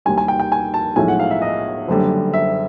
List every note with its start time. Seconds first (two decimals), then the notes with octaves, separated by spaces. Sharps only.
0.05 D#2 D#3 G3 G#5
0.18 G#5
0.28 G5
0.40 G5
0.52 G#5
0.74 A5
0.96 B1 A2 F3 G#3 G#5
1.08 F#5
1.20 F5
1.31 E5
1.42 D#5
1.88 F#1 F#2 D3 G3
2.33 E5